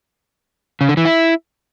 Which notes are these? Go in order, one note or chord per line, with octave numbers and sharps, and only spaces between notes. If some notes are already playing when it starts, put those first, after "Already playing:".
C#3
D3
E3
E4